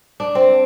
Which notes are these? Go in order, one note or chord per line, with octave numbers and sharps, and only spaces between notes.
D4
C4